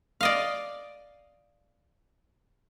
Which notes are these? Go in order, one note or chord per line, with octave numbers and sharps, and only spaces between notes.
D5 D#5 F5